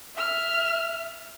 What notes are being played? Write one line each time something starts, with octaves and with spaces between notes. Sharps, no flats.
E5 F6